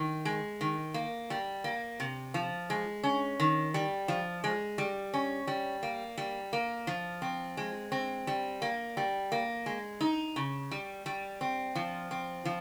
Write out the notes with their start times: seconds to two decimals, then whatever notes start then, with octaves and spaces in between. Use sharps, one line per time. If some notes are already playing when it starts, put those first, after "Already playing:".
Already playing: D#3
0.25 G#3
0.61 D#3
0.94 A#3
1.30 G3
1.64 A#3
2.00 C3
2.34 F3
2.70 G#3
3.04 C#4
3.40 D#3
3.74 G3
4.08 F3
4.44 G#3
4.78 G3
5.14 C#4
5.47 G3
5.83 A#3
6.18 G3
6.53 A#3
6.87 F3
7.22 C4
7.57 G#3
7.92 C4
8.27 G3
8.62 A#3
8.97 G3
9.32 A#3
9.66 G#3
10.01 D#4
10.36 C#3
10.71 G3
11.06 G3
11.41 C4
11.75 F3
12.11 C4
12.45 F3